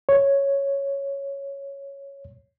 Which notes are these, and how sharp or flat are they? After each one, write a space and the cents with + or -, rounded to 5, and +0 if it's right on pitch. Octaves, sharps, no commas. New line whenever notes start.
C#5 +0